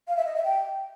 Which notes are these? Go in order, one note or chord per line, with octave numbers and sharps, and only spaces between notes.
F5
E5
D#5
E5
G5